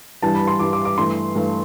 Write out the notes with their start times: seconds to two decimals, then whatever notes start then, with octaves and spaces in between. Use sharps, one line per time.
0.22 G2 E3 G3 A5
0.35 B5
0.47 C6
0.59 G2 E3 G3 D6
0.73 D6
0.85 D6
0.97 G2 E3 A3 C6
1.35 G2 E3 A3